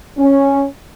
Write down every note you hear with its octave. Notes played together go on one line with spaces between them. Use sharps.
C#4